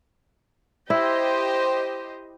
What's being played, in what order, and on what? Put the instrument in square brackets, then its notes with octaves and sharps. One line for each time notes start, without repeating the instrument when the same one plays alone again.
[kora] E4 [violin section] G4 C5 D#5